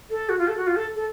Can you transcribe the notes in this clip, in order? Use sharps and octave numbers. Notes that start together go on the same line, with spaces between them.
A4
F#4
F4
A4
F#4
F4
A4
A4